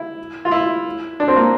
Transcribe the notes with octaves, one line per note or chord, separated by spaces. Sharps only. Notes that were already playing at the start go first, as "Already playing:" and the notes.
Already playing: E4
F4
E4
D4
C4
A#3